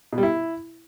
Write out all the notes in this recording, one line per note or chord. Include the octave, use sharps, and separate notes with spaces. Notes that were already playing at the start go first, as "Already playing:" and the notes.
B2
G3
E4